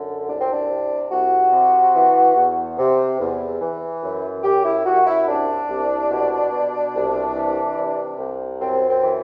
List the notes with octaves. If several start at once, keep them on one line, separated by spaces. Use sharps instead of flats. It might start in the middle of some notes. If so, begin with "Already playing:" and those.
Already playing: F#2 D3
C2 D4
C4
D4
C3
C2 F#4
C3
E3
E2
C3
E2
E3
F#2
F#2 G4
E4
F#2 F#4
E4
C2 D4
C2
B2
B2
C2
E3
C3
C2
F#2 C4
C4
E3